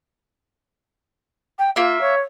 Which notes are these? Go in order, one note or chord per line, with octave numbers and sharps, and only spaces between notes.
G5
A#3 F4 E5
C#5